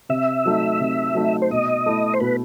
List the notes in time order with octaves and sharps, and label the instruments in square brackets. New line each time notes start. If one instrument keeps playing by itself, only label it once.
[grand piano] C3 [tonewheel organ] E5
[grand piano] F#3 A3 D#4
C3
F#3 A3 D#4
[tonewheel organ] C5
[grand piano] B2 [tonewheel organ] D#5
[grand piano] A3 E4
[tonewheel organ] C5
[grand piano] B2 [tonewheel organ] B4